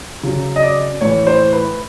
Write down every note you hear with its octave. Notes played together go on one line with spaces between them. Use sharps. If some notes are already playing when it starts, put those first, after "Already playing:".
C#3 F#3
D#5
D5
A2 E3 C#5
C5
B4